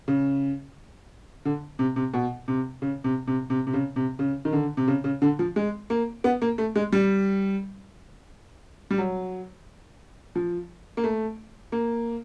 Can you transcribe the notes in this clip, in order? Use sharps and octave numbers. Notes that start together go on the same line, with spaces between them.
C#3
D3
C3
C3
B2
C3
C#3
C3
C3
C3
C3
C#3
C3
C#3
D#3
D3
C3
C#3
C#3
D3
F3
G#3
A#3
B3
A#3
A3
G#3
G3
G3
F#3
F3
A#3
A3
A#3